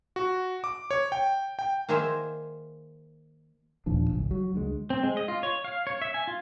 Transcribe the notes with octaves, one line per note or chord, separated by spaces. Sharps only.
F#4
D6
C#5
G5
G5
D#3 A#3 G#4 A#4 C5 E5
D#2 A#2 F3 D4
G#1 C#2 G#2
F#3
C#2 D3 F#3 G#3
C4
G#3
D#5
F4
C#5
F5
C#5
E5
G#5
F4